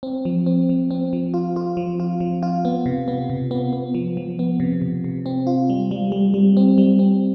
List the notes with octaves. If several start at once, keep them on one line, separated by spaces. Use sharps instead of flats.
C4
F3
C4
F3
C4
F3
F4
F4
F3
F4
F3
F4
B3
C3
B3
C3
B3
B3
F3
F3
B3
C3
C3
C3
C4
F4
G3
G3
G3
G3
C4
G3
C4